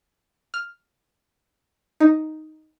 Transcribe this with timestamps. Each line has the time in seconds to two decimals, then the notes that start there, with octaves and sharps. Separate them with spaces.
0.54 F6
2.00 D#4